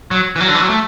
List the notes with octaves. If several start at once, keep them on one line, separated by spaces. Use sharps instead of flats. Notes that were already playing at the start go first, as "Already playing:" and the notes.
F#3
E3
F#3
D3
E3
F#3
A3